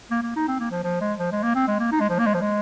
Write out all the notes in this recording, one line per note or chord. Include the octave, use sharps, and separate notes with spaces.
A#3
A#3
D#4
C4
A#3
F3
F3
G#3
F3
G#3
A#3
C4
G#3
A#3
D#4
G#3
F3
A#3
G#3
F3
G#3